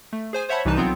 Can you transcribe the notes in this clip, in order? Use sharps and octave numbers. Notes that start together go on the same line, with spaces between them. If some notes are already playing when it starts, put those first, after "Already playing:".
A3
G#4 C5 G#5
C5 C#5 E5 F#5 A5 B5
C2 C3 E3 D#4 B4 A5
B1 F#3 B3 C4 F4 G6